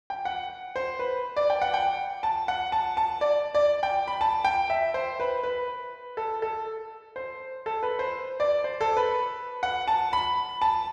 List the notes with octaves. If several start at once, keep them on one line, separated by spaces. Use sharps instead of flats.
G5
F#5
C5
B4
D5
G5
F#5
G5
A5
F#5
A5
A5
D5
D5
G5
B5
A5
G5
E5
C5
B4
B4
A4
A4
C5
A4
B4
C5
D5
C5
A4
B4
F#5
A5
B5
A5